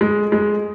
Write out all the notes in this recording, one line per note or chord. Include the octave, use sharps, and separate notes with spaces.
G#3
G#3